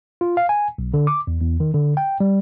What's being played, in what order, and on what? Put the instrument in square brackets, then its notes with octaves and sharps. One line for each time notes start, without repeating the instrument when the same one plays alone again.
[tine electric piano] F4
F5
G#5
B1
D3
D6
E2
E2
D#3
D3
G5
G3